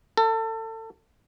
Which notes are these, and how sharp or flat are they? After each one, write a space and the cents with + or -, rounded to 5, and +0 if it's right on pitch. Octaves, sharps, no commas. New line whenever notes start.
A4 +30